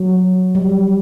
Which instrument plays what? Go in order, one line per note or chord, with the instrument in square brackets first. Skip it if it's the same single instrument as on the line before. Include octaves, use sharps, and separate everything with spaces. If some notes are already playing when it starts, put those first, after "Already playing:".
Already playing: [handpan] F#3
G3